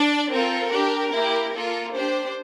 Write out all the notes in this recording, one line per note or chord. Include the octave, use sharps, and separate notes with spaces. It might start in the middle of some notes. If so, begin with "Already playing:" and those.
Already playing: D4 D5
C4 F4 A4 A#4
D4 G4
A#3 E4 G4
A#3 F4 A4
D4 G4 C5